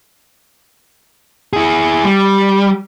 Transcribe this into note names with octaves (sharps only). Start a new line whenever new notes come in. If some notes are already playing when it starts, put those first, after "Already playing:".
E4 G#4
G3